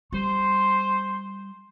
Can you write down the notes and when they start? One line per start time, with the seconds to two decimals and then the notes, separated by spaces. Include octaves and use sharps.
0.12 G3 C5 C6